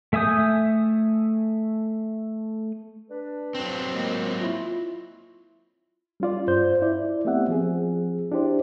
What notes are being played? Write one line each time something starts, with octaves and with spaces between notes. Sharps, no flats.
A3 E5 G#5 D#6 G6
D4 B4
F#3 C4
A#2 G#3 A#3
E4 F4
G3 C#4 F4 D5
G2 C5 G6
E4 D5
A3 B3 C4 G4 E5 F#5
F3 C4 G#4
D4 E4 G4 C5 D5